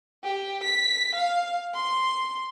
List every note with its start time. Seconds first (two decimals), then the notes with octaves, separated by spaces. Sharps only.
0.24 G4
0.64 B6
1.15 F5
1.74 C6